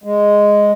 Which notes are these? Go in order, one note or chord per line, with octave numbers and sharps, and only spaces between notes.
G#3